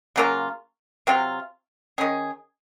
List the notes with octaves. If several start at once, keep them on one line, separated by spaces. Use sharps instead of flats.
C#3 F#3 A#3 F4
C3 F#3 C4 F4
D#3 F#3 C#4 G#4